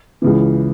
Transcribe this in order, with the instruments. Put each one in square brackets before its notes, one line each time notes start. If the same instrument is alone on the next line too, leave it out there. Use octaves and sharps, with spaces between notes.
[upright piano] C#2 C#3 E3